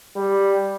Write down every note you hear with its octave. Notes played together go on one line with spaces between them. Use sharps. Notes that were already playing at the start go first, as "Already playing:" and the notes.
G3